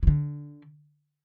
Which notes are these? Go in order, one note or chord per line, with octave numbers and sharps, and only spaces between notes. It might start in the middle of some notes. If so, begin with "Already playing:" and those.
E3
D3